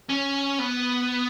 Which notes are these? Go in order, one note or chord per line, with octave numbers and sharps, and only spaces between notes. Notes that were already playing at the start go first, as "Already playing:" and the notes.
C#4
B3